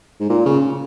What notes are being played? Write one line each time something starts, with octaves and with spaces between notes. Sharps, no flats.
G#2
A#2
C#3